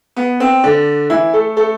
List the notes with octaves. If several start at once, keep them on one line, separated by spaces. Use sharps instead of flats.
B3
C4
D3 D4
E3 E4
A3 A4
A3 A4